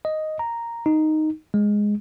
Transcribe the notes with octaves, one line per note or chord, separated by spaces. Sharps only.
D#5
A#5
D#4
G#3